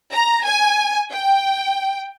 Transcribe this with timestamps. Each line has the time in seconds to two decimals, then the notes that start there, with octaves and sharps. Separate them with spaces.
0.12 A#5
0.45 G#5
1.12 G5